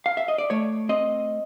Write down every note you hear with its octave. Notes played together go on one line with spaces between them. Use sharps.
F5
E5
D#5
D5
A3 C#5
C4 D#5